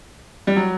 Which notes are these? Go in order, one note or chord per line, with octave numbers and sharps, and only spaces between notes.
G3
F#3